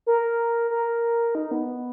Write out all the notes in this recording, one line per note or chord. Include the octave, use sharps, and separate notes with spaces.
A#4
A#4
D#4
B3